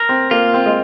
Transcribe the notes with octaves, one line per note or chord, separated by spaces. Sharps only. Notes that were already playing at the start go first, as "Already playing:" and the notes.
Already playing: A#4
C4
A#3 F4
C4
G#3